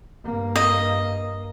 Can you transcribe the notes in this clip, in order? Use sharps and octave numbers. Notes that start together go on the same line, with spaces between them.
G2 A#3
D#5